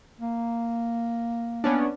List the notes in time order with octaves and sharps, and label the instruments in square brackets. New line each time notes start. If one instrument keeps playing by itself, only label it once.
[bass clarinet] A#3
[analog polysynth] B3 C#4 D4